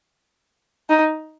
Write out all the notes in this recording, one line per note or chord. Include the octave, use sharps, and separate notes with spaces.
D#4